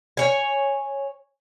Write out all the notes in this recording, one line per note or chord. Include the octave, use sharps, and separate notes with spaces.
C#5 G#5